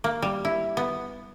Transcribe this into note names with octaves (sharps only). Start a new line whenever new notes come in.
A#3
G3
E4
B3